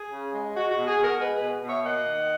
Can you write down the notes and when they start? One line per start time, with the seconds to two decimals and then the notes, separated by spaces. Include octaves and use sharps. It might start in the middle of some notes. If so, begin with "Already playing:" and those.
Already playing: G#4
0.10 C#3
0.32 G#3
0.54 G#3 F#4
0.70 F#4
0.76 B2
0.87 G#4
0.98 B2 F#4 A#4
1.19 G#3 G#4 B4
1.35 G#4 B4
1.41 B2
1.62 B2
1.67 C#5 E5
1.84 A#3 D#5 F#5
2.07 D#3